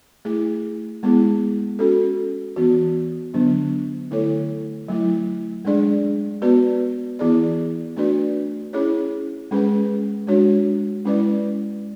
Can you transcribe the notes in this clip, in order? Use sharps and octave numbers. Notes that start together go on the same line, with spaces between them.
A3 E4 G#4
G#3 B3 E4 G#4
C#4 F#4 A4
E3 B3 F#4
D3 F#3 B3 D4
D3 A3 E4 A4 C#5
F#3 A3 E4
G#3 D4 G#4 D5
B3 F#4 B4 D5
E3 B3 E4 G#4 D5
A3 D4 F#4 B4 D5
C#4 E4 G#4 C#5
G#3 C#4 G#4 B4
G#3 D4 F#4 C#5
G#3 C#4 E4 B4 D5